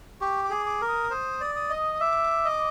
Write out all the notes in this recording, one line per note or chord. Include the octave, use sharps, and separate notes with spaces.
G4 C#6
D6
G#4
D6
A#4
D#6
C5 D#6
D5
D#6
D#5
D#6
E5 D6
D#5